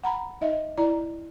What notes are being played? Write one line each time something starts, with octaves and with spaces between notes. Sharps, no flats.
F#5 A#5 B5
D#4 D#5 E5
E4 D5 A#5